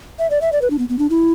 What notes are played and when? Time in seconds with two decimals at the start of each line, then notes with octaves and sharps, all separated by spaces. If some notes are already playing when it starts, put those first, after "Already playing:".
0.19 E5
0.30 D5
0.41 E5
0.52 D5
0.62 B4
0.70 D4
0.79 B3
0.89 B3
0.99 D4
1.10 E4